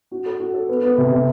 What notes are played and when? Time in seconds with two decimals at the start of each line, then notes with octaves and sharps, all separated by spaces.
0.11 F#4
0.26 A4
0.40 F#4
0.54 A4
0.69 B3
0.82 B3
0.98 C3
1.12 C3